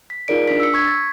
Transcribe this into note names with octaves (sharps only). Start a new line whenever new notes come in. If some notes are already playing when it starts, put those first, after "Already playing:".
B6
D#4 F4 G#4 A#4 D5 D7
D4 B6
E6 C#7
C#6 G#6 B6
A6